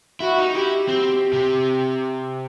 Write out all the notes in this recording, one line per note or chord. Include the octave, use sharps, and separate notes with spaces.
E4 F#4
D#4
E4 G4
C4 G4
C3